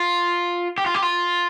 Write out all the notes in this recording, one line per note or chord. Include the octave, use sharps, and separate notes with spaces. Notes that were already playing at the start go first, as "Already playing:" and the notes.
Already playing: F4
G4
F4
G4
F4